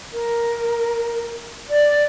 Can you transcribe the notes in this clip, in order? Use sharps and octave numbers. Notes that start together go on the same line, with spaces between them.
A#4
D5